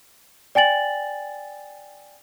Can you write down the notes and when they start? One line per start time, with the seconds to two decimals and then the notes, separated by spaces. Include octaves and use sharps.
0.55 D5 G5 G#5 A6 F#7